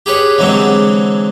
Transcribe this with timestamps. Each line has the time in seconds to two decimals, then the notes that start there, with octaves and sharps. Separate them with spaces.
0.06 G4 G#4 B4 C#5
0.38 D3 E3 F#3 G#3 C4